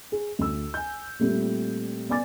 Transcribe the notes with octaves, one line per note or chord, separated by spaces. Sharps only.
G#4
D2 E6
G#5 G6
A#2 G3 A3 C4 G4
B3 D5 G#5 D6 A6